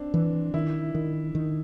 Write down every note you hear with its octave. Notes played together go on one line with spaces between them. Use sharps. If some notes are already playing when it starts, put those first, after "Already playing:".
Already playing: C4 D4
E3
D#3 E4
D#3
D#3